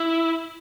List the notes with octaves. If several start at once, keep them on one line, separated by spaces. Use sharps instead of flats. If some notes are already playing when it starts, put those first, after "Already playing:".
Already playing: E4